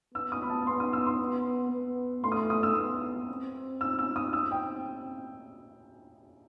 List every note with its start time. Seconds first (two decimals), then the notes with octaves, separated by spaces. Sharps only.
0.15 B3 E6
0.32 D#6
0.42 B5
0.50 A5
0.67 B3 C6
0.80 D#6
0.93 E6
1.06 C6
1.20 B3
1.72 B3
2.24 A3 C6
2.32 D#6
2.37 C6
2.50 D#6
2.63 E6
2.76 B3
3.29 C4
3.81 E6
3.99 E6
4.16 D#6
4.33 E6
4.51 G5